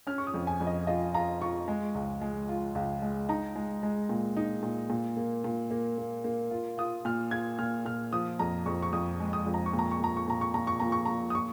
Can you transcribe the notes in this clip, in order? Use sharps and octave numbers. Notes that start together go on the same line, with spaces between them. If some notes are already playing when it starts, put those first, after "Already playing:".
C#4 F6
C#6
D#6
F2
G#5
F2
D#5
F4 D#5
F4 A#5
F4 C#6
G#3
C#2
G#3
F4
C#2
G#3
D#4 A#5
G#3
G#3
A#2
D#4
A#2
A#2
A#3
A#2
A#3
A#3
A#3
F4
F4 D#6
A#2 F6
F4 G#6
A#2 F6
A#2 F6
F3 D#6
F2 A#5
F2 C#6
C#6
F2 D#6
G#3
D#6
F2
A#5
C#6
A#2
A#5
C#6
A#2 A#5
C#6
A#2 A#5
C#6
A#2 A#5
C#6
A#2 A#5
C#6
A#2 A#5
D#6
C#6